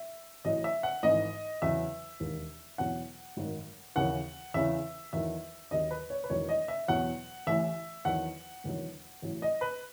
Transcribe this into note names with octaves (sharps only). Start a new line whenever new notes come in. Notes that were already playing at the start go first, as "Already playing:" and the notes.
Already playing: E5
A1 A2 F#3 D#5
E5
F#5
G#1 G#2 E3 D#5
E2 C#3 F#3 E5
E1 D#2 D#3
E2 B2 F#3 F#5
G#1 F#2 D#3
D#2 C#3 E3 F#5
E2 C#3 E3 E5
E2 D#3 F#3 E5
D#2 D#3 F#3 D#5
B4
C#5
B4
E1 E2 D#3 F#3 C#5
D#5
E5
E2 B2 F#3 F#5
A1 A2 E3 E5
E2 D#3 F#3 F#5
E1 E2 D#3 F#3
A1 A2 F#3
D#5
B4